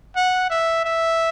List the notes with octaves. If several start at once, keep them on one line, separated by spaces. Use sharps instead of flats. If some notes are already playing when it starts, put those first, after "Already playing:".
F#5
E5
E5